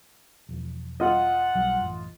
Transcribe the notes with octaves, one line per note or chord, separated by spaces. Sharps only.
E1 F3
F4 D#5 F#5
B1 F#3 G3
A1 F#2